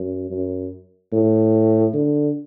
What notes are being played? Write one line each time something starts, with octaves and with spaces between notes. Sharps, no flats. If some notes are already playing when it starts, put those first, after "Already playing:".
Already playing: F#2
F#2
A2
D3